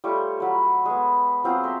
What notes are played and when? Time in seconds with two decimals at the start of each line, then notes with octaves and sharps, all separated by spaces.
0.04 G3 A3 F4 C#5
0.40 F#3 B5
0.86 G#3 B3
1.44 F#3 C4 F4 G#4
1.64 C5 E5 G5 A#5